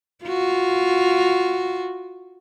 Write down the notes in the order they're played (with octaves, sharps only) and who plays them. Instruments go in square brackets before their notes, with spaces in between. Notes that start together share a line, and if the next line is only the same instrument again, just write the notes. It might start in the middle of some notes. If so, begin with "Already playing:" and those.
[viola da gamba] F4 F#4